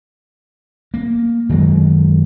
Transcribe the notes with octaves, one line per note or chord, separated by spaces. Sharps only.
A#3
F#2 D#3 F#3 G#3